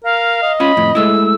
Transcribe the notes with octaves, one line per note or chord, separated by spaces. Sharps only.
A#4 F5
D#5
C#4 F4 B5
F2 A2
G#3 A3 E4 E6